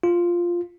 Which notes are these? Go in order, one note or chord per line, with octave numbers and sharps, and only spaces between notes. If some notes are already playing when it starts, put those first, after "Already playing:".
F4